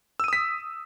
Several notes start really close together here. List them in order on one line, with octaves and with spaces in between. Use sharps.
E6 D#7 D#6 B6